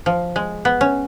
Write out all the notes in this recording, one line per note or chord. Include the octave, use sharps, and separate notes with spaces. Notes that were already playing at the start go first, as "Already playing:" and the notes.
F3
G#3
B3
C#4